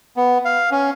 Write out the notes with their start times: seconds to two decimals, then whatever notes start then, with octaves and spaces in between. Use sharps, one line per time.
0.17 B3
0.45 F5
0.71 C#4